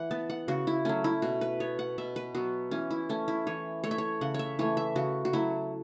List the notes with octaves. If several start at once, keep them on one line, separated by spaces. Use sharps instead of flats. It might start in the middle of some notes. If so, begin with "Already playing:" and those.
Already playing: E3 E4 F#5
B3 A5
F#5
C#3 F#4
E4
F#3 A3 C#4
E4
B2 F#4
B4
B3 C#5
F#5
B2 E5
B4
F#3 B3 F#4
E3 C#4
E4
A3 C#4
E4
E3 C#5
A3 C#5
E5
C#5
C#3 F#5
C#5 E5
E3 A3 C#5
E5
C#3 F#4
F#4
F#3 A3 E4